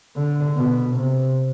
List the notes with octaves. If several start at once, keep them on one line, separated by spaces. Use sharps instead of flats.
D3
B2
C3